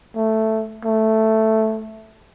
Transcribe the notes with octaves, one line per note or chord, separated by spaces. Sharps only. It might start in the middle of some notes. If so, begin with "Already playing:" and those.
A3
A3